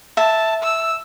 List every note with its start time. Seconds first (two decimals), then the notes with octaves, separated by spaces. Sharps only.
0.17 E5 A5
0.63 E6